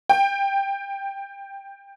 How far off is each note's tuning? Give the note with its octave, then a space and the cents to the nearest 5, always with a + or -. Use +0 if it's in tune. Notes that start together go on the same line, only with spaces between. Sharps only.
G5 +10